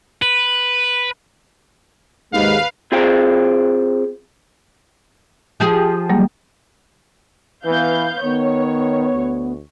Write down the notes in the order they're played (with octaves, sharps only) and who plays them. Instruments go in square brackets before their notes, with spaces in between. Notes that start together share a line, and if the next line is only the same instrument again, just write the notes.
[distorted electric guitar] B4
[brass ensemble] D#2 G#2 G#3 [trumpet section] B4 F5
[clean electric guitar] C4 F4 G#4 C5 F5 G5
[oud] F3 G4 G#4
[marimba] F#3 G3 A#3
[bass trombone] E3 [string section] B3 F5 G6 [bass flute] B4
[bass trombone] D#3 [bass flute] B3 [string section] C#5
[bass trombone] D2